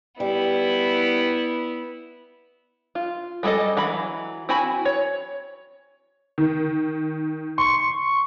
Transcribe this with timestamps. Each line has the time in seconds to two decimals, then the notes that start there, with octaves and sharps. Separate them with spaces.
0.20 G3 B3 E4
2.95 F4
3.43 G3 G#3 G#4 A4 D#5
3.77 E3 F#3 B5
4.49 C4 E4 F#4 G#5 B5
4.85 C#5
6.38 D#3
7.58 C6 C#6